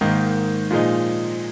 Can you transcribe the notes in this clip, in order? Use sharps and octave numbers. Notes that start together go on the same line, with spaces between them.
G#2 D#3 A#3
A#2 F3 G#3 D#4